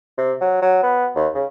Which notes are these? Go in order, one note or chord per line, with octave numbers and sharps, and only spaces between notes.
C3
F#3
F#3
B3
D#2
C#3